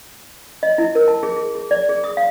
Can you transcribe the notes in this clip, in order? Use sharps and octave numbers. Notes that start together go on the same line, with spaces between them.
D#5
E4
A#4
A5
G#4
G#4
G#4
D5
G#4
D#6
F5